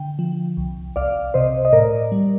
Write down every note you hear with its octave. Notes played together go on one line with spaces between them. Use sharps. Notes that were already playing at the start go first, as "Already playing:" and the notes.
Already playing: D3 G5
F3
C2
C2 D5 F5
C3 C5 D#5
D#5
A2 A#4 D5
G3